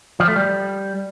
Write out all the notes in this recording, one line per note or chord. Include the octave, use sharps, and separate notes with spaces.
F3
A3
G3